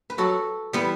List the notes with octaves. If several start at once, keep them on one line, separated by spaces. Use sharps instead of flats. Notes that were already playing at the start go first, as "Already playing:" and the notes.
B4
F#3 F#4 A4
E3 G3 B3